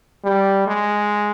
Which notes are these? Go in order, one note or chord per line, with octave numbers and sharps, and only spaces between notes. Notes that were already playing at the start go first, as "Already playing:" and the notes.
G3
G#3